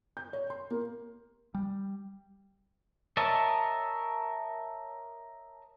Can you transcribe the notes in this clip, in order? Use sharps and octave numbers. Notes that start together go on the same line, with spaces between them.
G6
C#5
C6
A#3
G3
A#4 C#5 D#5 E5 A5